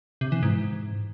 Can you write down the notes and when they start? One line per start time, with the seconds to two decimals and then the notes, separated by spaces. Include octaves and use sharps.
0.21 C3
0.32 E3
0.43 G#2